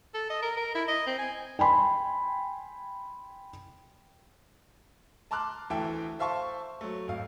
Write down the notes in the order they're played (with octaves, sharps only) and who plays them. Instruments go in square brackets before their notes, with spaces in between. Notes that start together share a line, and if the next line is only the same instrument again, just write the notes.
[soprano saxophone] A4
D#5
A#4
A#4
E4
D#5
C4
G#5
[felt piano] G5 G#5 B5 C6
[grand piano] A5 A#5 C6 D6 F6 F#6
D2 E3 A4 E5 G5 E6
C5 E5 F5 A5 C6 C#6
F#3 A3
G#1 F5